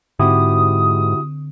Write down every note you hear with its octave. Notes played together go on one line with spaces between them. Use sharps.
G#2 D3 C4 E4 F#4 G4 D#6